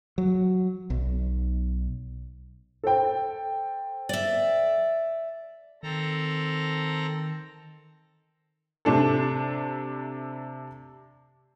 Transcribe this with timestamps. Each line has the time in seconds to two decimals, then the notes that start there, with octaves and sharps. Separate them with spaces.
0.18 F#3
0.90 B1
2.83 A4 C5 G5
4.09 D5 E5
5.83 D#3 C4 A4 A#5
8.85 C3 A3 D4 A4